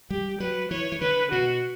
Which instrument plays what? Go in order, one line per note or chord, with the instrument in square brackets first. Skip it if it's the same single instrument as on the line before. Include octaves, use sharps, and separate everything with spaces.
[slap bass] G3 [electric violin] G4
[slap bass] F#3 [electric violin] B4
[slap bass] E3 [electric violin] C#5
[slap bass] E3
[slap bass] D3 [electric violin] B4
[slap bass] B2 [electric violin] F#4